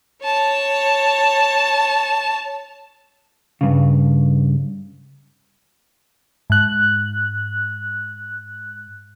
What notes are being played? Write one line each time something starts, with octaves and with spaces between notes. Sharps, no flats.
C#5 A5
G2 C#3
G#2 F#6